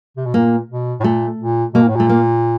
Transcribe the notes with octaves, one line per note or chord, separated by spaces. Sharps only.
C3
B2
A#2 A#3
B2
A2
A#2 A3
A#2
B2 A#3
A#2
A2
A#2 A3
A#3